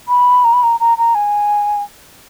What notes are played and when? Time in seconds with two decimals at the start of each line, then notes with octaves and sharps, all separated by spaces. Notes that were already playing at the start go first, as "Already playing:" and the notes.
0.08 B5
0.44 A#5
0.53 B5
0.63 A#5
0.80 A#5
0.98 A#5
1.15 G#5